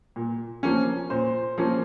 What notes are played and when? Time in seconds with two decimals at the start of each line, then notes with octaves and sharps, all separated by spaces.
0.16 A#2
0.63 F3 A#3 C#4
1.10 A#2 C5
1.58 F3 A#3 C#4